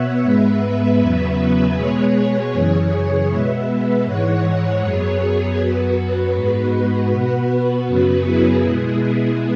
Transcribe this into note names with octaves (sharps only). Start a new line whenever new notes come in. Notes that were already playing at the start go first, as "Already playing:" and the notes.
Already playing: B2 B3 C#5 E5 F#5
G#2 G#3 B3 B4 E5
E2 C#3 F#3 B3
B2 G#3 B3 G#4 C#5
G#4 C#5
F#2 C#3 E3
B2 G#3 B3 B4 E5
G#2 E3 G#3 C#5 F#5
F#2 F#3 B3 G#4 C#5
G#4 C#5
F#2 F#3 B3 F#4 B4
G#2 G#3 B3
B2 B3
F#2 C#3 F#3 B3 F#4
E4 G#4
B2 G#3 B3